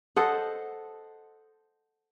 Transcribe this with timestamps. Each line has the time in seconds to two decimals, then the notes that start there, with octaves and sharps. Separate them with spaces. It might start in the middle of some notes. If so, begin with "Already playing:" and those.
0.16 A4 C5 D#5 F#5